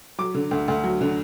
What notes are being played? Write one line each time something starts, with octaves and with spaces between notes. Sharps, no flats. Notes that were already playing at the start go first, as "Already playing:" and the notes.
F#3 D6
D3
D2
D2
F#3
D3